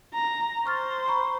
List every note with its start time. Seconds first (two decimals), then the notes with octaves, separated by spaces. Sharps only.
0.14 A#5
0.66 C5 C#6 F6 A6
1.08 A#5 B5 C#6